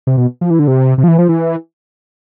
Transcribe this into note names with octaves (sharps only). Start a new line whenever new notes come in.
C3
B2
F3
E3
D3
C3
C3
F3
E3
F3
E3